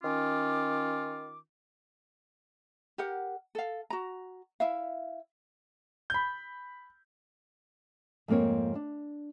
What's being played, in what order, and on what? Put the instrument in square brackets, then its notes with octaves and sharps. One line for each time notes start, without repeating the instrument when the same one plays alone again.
[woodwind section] D#3 C#4 F4 D6
[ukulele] G4 A#4 F#5
A4 F5
F#4 A#5
E4 E5 F5
[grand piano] B5 G6
[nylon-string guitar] F2 G#2 A#3 C4 C#5
D4